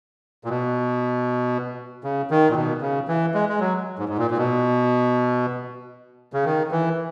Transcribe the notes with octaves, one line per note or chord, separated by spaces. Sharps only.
A#2
B2
C#3
D#3
A#2
B2
C#3
E3
G#3
G#3
F#3
G#2
G#2
A#2
A#2
B2
C#3
D#3
E3